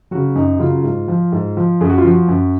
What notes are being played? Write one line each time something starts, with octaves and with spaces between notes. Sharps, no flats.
C#3 F#3 F#4
F#2 D#4
C#3 F#3 F4
G#2
F3
G#2
F3
F#2 G#4
F#4
F4
F3 F#4
F#2